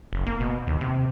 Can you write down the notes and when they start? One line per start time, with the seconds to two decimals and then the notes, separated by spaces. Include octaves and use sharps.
0.13 F#1
0.26 A#3
0.40 B2
0.67 D#2
0.81 C3